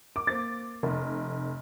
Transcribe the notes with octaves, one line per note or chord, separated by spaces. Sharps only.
D6
A#3 C5 A6
F1